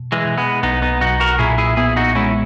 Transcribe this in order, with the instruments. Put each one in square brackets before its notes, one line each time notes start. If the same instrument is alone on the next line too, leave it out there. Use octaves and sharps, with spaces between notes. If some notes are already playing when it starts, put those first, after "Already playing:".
Already playing: [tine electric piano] B2
[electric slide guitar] E3 G#3
[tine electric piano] B2
[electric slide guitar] G#3 B3
[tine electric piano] B1 [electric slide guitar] B3 D#4
[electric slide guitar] B3 D#4
[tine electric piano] B1 [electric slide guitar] D#4 F#4
[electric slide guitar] F#4 A#4
[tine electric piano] A#2 [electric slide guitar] E4 G#4
[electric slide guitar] E4 G#4
[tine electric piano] B3 [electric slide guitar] E4 G#4
[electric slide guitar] D#4 F#4
[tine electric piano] G#3 [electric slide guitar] C#4 E4